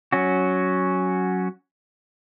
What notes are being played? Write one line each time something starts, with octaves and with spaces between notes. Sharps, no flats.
F#3 C#4 F#4